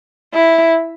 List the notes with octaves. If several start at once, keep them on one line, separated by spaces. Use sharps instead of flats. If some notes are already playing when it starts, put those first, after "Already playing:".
E4